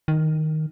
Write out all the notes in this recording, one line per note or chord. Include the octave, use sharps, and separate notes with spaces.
D#3